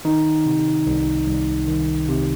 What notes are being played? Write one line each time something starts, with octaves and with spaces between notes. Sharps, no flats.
D#3 D#4
C3
C2
C2
D#3
C3